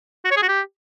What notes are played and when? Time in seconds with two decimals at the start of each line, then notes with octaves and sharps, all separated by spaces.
0.25 F#4
0.31 C#5
0.37 G#4
0.43 F#4
0.48 G4